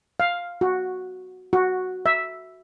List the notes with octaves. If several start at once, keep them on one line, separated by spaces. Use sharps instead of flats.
F5
F#4
F#4
E5